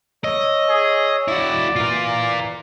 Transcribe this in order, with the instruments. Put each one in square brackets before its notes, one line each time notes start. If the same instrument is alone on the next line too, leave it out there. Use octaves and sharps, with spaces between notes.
[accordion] C#5 E6 [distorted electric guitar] D#5
[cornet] G#4
[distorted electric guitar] E4 F#4 [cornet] D5
[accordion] E3 [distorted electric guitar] F4 A#4